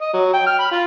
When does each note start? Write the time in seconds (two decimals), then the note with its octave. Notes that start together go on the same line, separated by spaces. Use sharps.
0.01 D#5
0.13 F#3
0.33 G5
0.46 F6
0.59 B5
0.71 F4